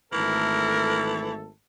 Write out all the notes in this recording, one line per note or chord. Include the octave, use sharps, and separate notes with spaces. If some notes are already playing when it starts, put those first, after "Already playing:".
G#1 E3 A3 A4 A#4